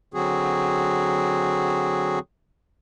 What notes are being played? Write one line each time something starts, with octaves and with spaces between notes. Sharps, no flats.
D3 F#3 C4 F#4 G#4